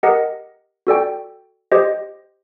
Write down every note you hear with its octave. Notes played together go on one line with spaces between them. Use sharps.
G4 A#4 D#5 F#5
F#4 A4 D5 G5
G4 C5 D#5